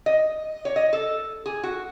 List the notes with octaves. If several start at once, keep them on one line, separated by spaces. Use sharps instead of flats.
D#5
C#5
D#5
A4
G#4
F#4